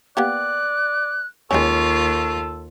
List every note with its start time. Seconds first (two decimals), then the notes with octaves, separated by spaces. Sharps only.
0.17 A#3 B3 G4 D5 F#6
1.51 D#2 G#3 C#4 F4 A4 C#6